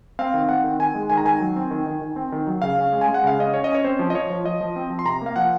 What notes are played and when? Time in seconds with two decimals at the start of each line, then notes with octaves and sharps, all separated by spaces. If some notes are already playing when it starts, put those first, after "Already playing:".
0.19 C4 F5
0.34 D#3
0.49 C4 F#5
0.64 D#3
0.79 D#3 G#5
0.95 G#3
1.10 D#3 G#5
1.17 A#5
1.25 D#3 G#5
1.40 F#3
1.56 C4
1.71 D#3
1.86 D#3
2.02 D#3
2.16 C4
2.32 D#3
2.47 F#3
2.62 C#3 F5
2.78 C#4
2.93 G#3
3.01 G#5
3.08 G#3
3.14 F#5
3.24 C#3 F5
3.39 C#4 D#5
3.54 C#4 C#5
3.64 D#5
3.69 C#4
3.75 C#5
3.84 C4 C5
3.99 F3
4.10 D#5
4.14 F3 C#5
4.30 F3
4.44 F3 D#5
4.61 F3
4.76 C4
4.90 F3
4.99 C6
5.05 C3 A#5
5.22 A#3 F5
5.36 F3 F#5